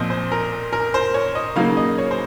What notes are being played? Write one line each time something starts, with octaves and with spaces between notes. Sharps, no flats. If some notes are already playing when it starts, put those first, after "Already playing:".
Already playing: A#2 F3 C4 D#5
C5
A#4
A#4
C5
C#5
D#5
C#3 F#3 A#3 D#4 F5
D#5
C#5
C5